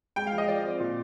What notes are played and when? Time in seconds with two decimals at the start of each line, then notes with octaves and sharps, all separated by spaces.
0.16 G#3 G5
0.27 F5
0.32 F3
0.38 D#5
0.48 F3 D5
0.64 C4
0.80 A#2